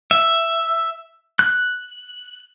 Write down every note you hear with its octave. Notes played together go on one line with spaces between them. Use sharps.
E5
F#6